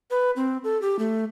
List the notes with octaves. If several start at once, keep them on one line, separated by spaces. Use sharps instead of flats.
B4
C4
A4
G4
A3